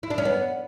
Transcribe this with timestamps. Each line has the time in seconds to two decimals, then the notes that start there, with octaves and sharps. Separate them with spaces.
0.03 E4
0.10 D4
0.18 C#4
0.25 B3